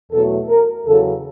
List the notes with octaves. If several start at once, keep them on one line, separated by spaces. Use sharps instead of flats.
E2 B2 F#3 A3 A4
A#4
E2 C#3 F#3 A4